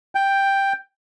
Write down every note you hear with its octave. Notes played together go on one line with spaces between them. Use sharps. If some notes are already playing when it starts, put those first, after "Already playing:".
G5